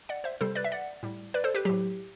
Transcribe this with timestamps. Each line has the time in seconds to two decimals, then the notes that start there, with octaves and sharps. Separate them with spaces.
0.09 D5 F#5
0.24 C5 E5
0.41 C3 G3 A4 C5
0.55 B4 D5
0.64 E5
0.72 D5 F#5
1.03 A2 G3
1.34 B4 D5
1.44 A4 C5
1.55 G4 B4
1.65 A2 F#3 G4